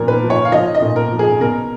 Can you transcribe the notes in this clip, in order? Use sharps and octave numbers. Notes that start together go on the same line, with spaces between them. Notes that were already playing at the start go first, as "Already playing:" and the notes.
Already playing: A#2 F3 A#4
B4
F3
C#5
F5
F3 D#5
D#5
A#2
A#4
F3
G#4
B2 A#4